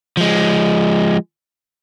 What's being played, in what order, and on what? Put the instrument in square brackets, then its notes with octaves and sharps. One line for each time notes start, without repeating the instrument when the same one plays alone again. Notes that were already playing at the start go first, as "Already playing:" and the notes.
[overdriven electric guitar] F3 G#3